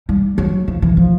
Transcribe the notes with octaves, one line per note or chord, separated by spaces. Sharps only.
G3
F#3
F3
E3
F3